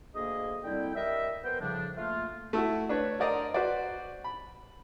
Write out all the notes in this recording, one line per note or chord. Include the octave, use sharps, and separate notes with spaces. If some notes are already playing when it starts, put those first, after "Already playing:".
D2 A#3 G#4 D#5
D3 G3 C4 E4 G5
G3 A#4 D#5 E5
B3 A#4 C5 G5
A2 C#3 F3 G3 D4
A3 A#3 F4
A3 E4 F#4
D4 B4 C#5
A#4 C5 D5 D#5 A#5
F#4 B4 C5 D5
B5